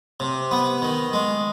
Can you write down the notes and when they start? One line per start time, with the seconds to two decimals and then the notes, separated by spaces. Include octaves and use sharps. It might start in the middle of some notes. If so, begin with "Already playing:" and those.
0.20 C3
0.51 B3
0.82 D#3
1.13 G#3